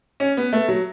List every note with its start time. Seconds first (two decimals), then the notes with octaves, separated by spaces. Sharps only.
0.20 C#4
0.37 B3
0.53 A3
0.68 F#3